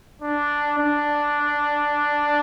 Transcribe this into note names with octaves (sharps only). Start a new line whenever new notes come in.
D4
D4